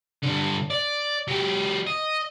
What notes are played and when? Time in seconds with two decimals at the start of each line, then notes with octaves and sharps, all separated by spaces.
0.23 G2 D3
0.71 D5
1.28 F#3 G4
1.87 D#5